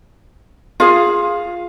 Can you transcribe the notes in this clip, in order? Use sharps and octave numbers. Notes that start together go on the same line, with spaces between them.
F4 G#4 F5